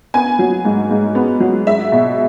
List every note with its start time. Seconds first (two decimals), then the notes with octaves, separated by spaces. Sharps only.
0.14 B3 G#5
0.39 F#3
0.65 G#2
0.91 G#2
1.15 B3
1.40 F#3
1.66 G#3 E5
1.92 B2